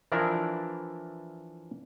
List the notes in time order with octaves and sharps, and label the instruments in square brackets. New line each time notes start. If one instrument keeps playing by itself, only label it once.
[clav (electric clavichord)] E3 F3 D4 E4 A#4 D5